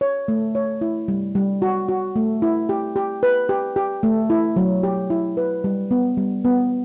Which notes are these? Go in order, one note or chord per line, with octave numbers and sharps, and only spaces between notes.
C#5
A3
C#5
E4
G3
G3
F#4
F#4
A3
E4
G4
G4
B4
G4
G4
A3
E4
F#3
G4
E4
B4
G3
B3
G3
B3